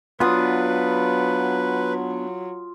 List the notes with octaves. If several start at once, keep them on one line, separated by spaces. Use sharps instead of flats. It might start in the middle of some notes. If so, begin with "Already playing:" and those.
F#3 B3 D4 F4 B4 D#6